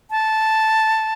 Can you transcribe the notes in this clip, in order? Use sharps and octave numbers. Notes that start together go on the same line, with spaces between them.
A5